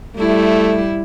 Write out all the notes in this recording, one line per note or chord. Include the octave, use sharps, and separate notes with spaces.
G3 A3 E4